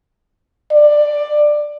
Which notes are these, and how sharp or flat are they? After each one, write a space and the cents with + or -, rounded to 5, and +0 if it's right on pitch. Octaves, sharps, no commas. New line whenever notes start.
D5 +15